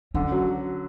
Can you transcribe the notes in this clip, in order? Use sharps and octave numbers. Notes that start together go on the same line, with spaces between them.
D3 C#4
F#3